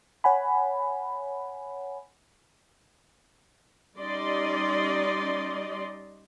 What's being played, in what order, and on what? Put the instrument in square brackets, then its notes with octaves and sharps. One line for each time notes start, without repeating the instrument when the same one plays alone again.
[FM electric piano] C#5 F#5 G#5 B5
[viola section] G3 C#4 D#4 D5 D#5 C6